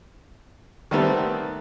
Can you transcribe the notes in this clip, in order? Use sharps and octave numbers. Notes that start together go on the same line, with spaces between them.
D#3 G3 A3 B3 C4